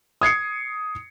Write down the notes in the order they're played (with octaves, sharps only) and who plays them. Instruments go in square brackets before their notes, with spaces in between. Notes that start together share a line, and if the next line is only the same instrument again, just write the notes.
[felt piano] D#6 G#6 C7 C#7